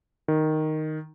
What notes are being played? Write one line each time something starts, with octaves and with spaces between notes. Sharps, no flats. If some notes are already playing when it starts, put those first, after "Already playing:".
D#3